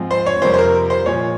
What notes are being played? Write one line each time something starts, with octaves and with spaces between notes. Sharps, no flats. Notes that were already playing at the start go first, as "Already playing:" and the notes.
Already playing: G#2 F3 G#3 C4
C5
C#5
F2 C3 G3 A#3 C5
C5
A#4
C5
A#2 F3 G#3 C#5